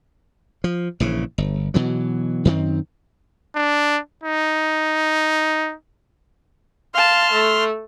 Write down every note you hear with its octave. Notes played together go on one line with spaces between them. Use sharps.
F3
A#1 C#3 E3
G1
B2 E3 F#3
F#2 D#3 C4
D4
D#4
F5 A5 C6 F6
A3